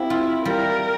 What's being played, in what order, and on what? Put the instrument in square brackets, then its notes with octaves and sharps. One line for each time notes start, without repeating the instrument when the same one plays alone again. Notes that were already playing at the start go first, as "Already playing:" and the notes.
Already playing: [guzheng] A#3 C4 G4 [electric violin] E4
[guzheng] F4
[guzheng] G3 [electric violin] A#4